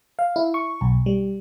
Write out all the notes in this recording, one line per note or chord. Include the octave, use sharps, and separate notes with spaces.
F5
E4
C#6
B1
G3